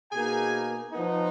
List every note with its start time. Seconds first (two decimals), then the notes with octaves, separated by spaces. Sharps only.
0.12 B2 A#3 D#4 G#4 G#5
0.92 F3 B3 D#4